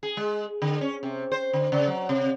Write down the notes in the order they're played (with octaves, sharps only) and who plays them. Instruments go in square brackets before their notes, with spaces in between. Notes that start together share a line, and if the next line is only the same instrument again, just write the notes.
[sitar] G#4
G#3
D3
C#4
C3
C5
D3
C#3
F#3
C3